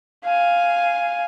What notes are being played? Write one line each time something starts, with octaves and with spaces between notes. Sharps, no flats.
F5 G#5